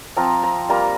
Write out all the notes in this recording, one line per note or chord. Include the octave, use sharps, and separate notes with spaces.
F3 C4 F4 A#5
A#5
G3 A#3 F4 A#5